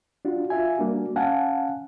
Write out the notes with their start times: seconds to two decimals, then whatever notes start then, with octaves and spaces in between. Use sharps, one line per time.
0.25 D4 F4 F#4
0.50 F4 E5 G#5
0.78 G3 A#3 D4 F#4
1.16 C#4 F5 F#5 G#5 A5